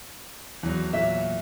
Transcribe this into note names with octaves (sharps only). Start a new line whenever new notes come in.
E2 F#3
A#2 C#5 E5